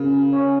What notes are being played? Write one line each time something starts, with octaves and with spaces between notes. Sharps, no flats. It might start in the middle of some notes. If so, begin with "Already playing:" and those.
Already playing: C#3 F#4 A#4 F5
C#5 F5 G#5 C#6